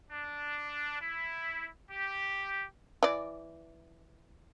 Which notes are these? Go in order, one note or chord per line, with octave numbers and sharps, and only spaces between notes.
D4
E4
G4
E3 D5